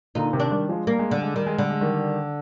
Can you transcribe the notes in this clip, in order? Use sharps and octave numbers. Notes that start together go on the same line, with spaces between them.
A#2 D3 D#4
C3 D#3
D4
D#3 G3
F3 G#3
G3 A#3
G#3
D3 G3
G#3
D#3 G3
G#3
D3 G3
G#3
D#3 G3